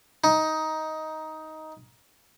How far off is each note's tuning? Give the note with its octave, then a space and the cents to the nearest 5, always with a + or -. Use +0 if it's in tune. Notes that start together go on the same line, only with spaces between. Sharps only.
D#4 +10